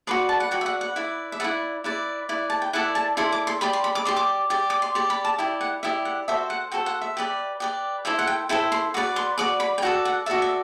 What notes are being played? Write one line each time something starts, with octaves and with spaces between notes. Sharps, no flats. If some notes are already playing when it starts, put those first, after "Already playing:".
F#4 B4 D5 C6
A5
F#5
F#4 B4 D5 G5
E5
F#5
F#5
E4 B4 D5
E5
E4 B4 D5 F#5
E4 B4 D5
E4 B4 D5
A5
G5
E4 A4 D5 F#5
A5
E4 A4 D5 C6
D6
C6
G4 D5 B5
C6
B5
D6
G4 D5 C6
D6
G4 D5
D6
C6
G4 D5 B5
B5
A5
E4 G4 D5 G5
F#5
E4 G4 D5 E5
F#5
F#4 A4 C5 E5
F#5
F#4 A4 C5 G5
F#5
E5
G4 B4 D5
G4 B4 D5
E4 A4 C5 E5
F#5
G5
E4 A4 C5 G5
C6
F#4 B4 D5 D6
C6
F#4 B4 D5 D6
B5
G5
F#4 A4 D5 F#5
F#5
F#4 A4 D5 E5
E5